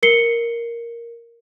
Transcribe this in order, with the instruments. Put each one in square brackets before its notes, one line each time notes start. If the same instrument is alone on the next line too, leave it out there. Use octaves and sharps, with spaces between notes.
[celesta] A#4 C7 C#7 G7